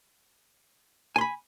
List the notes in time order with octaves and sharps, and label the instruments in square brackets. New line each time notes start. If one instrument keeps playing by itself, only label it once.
[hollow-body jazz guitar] G#5
C6
B5